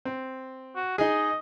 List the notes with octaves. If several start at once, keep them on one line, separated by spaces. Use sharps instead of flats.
C4
F#4
D#4 G#4 D#5